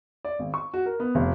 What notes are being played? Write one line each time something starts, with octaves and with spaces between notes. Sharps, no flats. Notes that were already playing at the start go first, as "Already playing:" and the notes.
D5
G#1
C#6
F#4
A#4
B3
F1